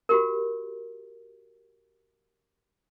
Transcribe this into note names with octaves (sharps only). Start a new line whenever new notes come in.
F#4 G4 A#4